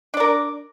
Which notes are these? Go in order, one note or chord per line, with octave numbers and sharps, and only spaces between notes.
D4 A#4 D5